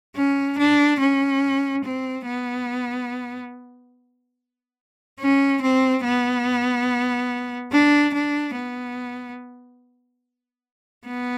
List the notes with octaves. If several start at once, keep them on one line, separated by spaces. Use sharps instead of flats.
C#4
D4
C#4
C4
B3
C#4
C4
B3
D4
D4
B3
B3